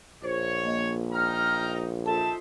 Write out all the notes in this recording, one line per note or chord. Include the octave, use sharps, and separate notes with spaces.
A#1 C5 C#5
A#3 D#5
D#4 G5 A#5 F6
D#4 F4 A4 C5 E5 A5